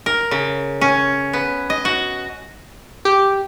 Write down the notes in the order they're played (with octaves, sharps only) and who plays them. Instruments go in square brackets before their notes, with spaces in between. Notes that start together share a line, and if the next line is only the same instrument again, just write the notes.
[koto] A#4
C#3
C#4
B3
D#5
F#4
[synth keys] G4